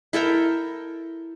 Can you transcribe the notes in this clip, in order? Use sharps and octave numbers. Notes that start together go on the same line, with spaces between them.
E4 A4 A#4 G5